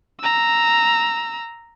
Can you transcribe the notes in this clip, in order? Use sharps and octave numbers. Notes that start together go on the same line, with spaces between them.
A#5 E6